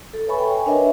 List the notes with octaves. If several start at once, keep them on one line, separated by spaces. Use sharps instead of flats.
A4
B4 C#5 E5 G#5 B5 C#6
G5
G#5
D4 A#4 B4 C#5 D#5 E5